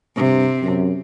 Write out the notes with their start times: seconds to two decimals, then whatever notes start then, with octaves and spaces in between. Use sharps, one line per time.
0.16 G2 C3
0.62 F#2